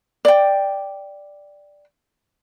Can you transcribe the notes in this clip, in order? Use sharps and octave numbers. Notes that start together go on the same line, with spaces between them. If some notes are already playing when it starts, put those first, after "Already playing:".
D5 G5